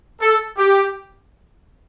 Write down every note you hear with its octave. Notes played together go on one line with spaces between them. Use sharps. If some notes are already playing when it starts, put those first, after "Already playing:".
A4
G4